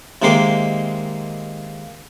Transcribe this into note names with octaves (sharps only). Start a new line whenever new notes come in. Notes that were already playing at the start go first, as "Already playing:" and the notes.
C3 D#3 G#3 A#3 C6 D6